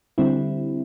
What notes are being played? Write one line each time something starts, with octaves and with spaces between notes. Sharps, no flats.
D3 G3 C4 E4